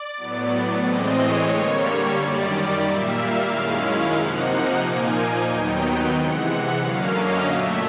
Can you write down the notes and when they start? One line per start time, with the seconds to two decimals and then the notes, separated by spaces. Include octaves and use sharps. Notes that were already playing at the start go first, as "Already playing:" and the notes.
Already playing: D5
0.17 A2 F#3 B3
0.82 A2 E3 G#3 C4 D#5
1.16 C#5
1.49 D3 G3 A#3 C#5
2.15 F#2 D#3 G3 D5
2.48 D5
2.81 A#2 G3 A#3 E5
3.14 F5
3.47 F#2 D#3 G#3 C#4 E4 F5
3.81 F5
4.13 C3 F3 A#3 D#4 F#5
4.80 A#2 F3 A#3 D#4 G#5
5.46 D#2 D#3 F#3 B3 D#4 G5
6.12 C3 E3 G#3 F#5
6.45 F#5
6.78 F#2 D3 F#3 A#3 C#4 F5
7.11 D#5
7.44 A#2 F#3 A3 E5